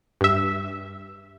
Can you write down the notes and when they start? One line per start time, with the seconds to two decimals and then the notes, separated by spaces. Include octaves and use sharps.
0.21 G2 E5